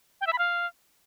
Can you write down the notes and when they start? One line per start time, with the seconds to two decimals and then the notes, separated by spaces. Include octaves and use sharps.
0.21 G5
0.27 E5
0.33 B5
0.38 F5